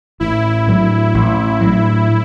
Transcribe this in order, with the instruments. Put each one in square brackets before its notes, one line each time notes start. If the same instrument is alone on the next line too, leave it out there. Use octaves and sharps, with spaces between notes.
[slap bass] A1 [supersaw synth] E4
[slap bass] A2 F#3
A1
A2 F#3